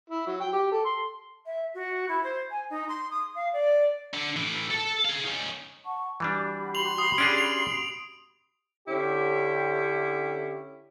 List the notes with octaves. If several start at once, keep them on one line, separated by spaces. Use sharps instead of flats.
E4
F#3
G5
G4
A4
C6
E5
F#4
E4
C5
G#5
D#4
C6
D#6
F5
D5
D3
A2 E3
A4 A5
G#4 F5
C#4 D#4
F#5 A5 C#6
E3 G3 D4 F#4 G4 B5
C6 F7 F#7
D#6
C#4 D4 G#4 D7
F7
D3 C#4 E4 G4